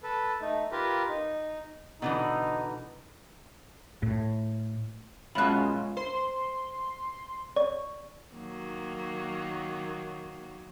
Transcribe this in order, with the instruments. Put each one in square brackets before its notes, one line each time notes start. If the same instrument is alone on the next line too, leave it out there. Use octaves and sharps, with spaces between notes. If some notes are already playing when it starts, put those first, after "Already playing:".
[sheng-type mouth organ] A4 B4
A3 D#4
F4 G4 A#4 B4
D#4
[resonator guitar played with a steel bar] B2 D3 E3 [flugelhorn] D#4
[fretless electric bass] A2
[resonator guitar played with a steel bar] F#2 B2 [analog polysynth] G#3 C#4 F4 [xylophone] B5 F#6
[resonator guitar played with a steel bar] C5 [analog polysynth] C6
[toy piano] D5 [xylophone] C#6
[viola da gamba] D#3 F#3 A#3